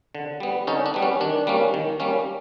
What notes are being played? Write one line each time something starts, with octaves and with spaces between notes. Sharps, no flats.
D3
G3 B3
D3 C#4 D#4
D4
G3 B3
C#4
D#3 D4
G3 A#3 C#4
D#3
G3 A#3 C#4